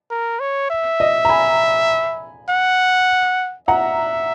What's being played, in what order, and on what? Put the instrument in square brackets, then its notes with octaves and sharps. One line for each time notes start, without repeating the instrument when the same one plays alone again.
[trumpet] A#4
C#5
E5
[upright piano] D#5
A#5
G#5 B5
[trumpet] F#5
[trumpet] E5 [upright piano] F#5 A#5